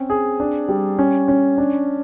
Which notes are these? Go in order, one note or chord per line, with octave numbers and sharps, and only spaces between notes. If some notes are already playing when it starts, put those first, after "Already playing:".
Already playing: C4 C#4
G#4
D4
G3
C#4
C#4
D4